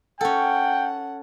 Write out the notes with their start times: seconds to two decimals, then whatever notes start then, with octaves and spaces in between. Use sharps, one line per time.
0.21 C#4 A4 F#5 G5